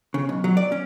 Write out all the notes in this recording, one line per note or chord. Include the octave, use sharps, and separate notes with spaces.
C#3
B1
F#3
D5
C#4